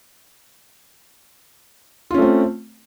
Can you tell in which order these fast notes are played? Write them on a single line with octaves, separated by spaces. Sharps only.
F4 C#4 A3 C4